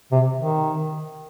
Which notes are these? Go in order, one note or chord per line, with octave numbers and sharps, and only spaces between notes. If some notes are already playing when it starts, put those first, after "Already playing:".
C3
D#3